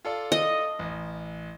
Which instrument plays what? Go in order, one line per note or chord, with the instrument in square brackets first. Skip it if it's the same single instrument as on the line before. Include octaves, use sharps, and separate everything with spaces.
[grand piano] F4 A4 D5
[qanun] D#5
[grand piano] A1